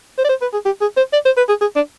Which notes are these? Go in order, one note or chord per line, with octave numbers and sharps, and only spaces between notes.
C5
D5
C5
B4
G#4
G4
G#4
C5
D5
C5
B4
G#4
G#4
D4